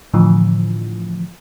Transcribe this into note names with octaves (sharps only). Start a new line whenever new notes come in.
A2 D3 E3 F3